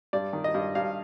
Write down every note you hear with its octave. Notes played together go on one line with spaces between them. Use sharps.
G2 D5
D#3
D#5
G2
G2 F5